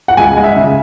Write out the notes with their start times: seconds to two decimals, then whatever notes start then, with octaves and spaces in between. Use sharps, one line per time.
0.08 F#5
0.17 C#2 G#5
0.37 G#3
0.44 E5
0.56 C#3